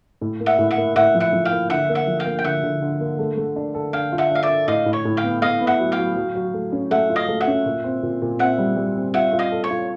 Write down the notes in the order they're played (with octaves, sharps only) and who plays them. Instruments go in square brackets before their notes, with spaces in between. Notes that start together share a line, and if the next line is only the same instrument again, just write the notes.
[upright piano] A2
A#3
[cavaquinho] E5 F#5
[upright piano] A2
[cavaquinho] E5 F#5
[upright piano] A#3
[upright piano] A2 [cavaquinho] E5 F#5
[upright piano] F3
[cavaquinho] E5 F#5
[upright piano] F3
[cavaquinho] F5 G5
[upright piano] A#3
[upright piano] D3 [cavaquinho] E5 F#5
[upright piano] A#3
[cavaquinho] E5 F#5
[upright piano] F3
[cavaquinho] F5 G5
[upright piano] A#3
[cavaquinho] G5
[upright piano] D3 [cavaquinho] E5 F#5
[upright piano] D3
D3
A#3
A3
A3
D4
A4
[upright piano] D4 [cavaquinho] F5 G5
[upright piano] F4
[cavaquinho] E5 F#5
[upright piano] D4 [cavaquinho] F5
[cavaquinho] D5 E5
[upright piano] D4
[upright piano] A2 [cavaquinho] D#5 F5
[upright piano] A2
[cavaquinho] C#5
[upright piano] A2
[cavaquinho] F5 G5
[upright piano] B3
[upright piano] B3 [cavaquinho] D#5 F5
[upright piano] B3
[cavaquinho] E5 F#5
[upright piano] F#3
[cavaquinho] F5 G5
[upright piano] F#3
F#3
F#3
A3
C#4
[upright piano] A3 [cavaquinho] E5 F#5
[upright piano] F4
[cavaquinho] D#5 F5
[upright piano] A3
[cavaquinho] E5 F#5
[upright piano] C#4
A#2
C4
A#2
A#2
[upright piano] C4 [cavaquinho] E5 F#5
[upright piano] G3
G3
C4
[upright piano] F4 [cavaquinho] E5 F#5
[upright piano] F4
[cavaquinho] D#5 F5
[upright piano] A4
[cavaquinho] C#5
[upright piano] F4